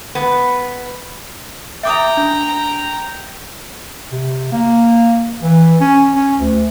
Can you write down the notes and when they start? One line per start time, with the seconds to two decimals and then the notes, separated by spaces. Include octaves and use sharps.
0.15 B3
1.83 E5 G5 A#5 D6 D#6
2.17 D4 G6
4.12 C3
4.52 A#3
5.43 E3
5.81 C#4
6.14 C#4
6.39 D2